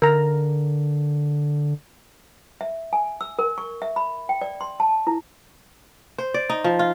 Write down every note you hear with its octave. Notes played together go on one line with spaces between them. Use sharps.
D3 A#4 A#5
E5
G#5
E6
A#4
C#6
E5
B5
G5
D5
C6
A5
E4
C5
D5
D#4
F3
F4